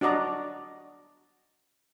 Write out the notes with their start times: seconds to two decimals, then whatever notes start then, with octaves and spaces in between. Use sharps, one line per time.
0.01 D4 F#4 D5 D#5 A#5